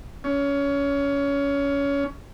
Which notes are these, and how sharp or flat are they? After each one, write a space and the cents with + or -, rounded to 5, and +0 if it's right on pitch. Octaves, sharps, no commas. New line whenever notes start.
C#4 +20